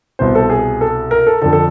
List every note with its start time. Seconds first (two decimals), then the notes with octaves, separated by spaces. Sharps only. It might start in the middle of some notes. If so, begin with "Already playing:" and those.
0.19 C2 B2 C5
0.35 A4
0.50 G#4
0.81 A4
1.11 A#4
1.27 A4
1.42 F2 D3 A4
1.53 A4